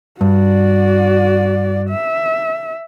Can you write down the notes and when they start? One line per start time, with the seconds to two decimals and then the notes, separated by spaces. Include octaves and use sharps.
0.21 G2 F#4 D5
1.89 E5